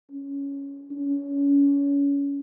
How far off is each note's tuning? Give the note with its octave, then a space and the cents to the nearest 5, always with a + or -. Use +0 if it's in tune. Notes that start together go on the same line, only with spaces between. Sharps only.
C#4 +5
C#4 +25